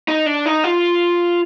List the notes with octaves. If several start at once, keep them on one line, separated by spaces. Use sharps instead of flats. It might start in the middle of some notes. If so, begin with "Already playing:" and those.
D#4
D4
D#4
F4